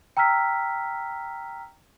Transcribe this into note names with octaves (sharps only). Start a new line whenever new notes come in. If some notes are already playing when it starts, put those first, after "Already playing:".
G5 A#5 E6 F6 B6